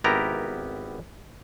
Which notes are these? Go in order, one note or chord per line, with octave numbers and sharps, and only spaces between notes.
G#1 B3 E4 G4 A#4 A#5